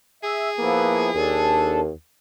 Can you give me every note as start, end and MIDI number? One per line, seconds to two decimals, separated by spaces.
0.23 1.88 68
0.23 0.49 76
0.58 1.10 53
0.58 1.09 58
0.58 1.10 59
0.58 1.10 64
1.15 1.90 39
1.15 1.80 62
1.15 1.80 69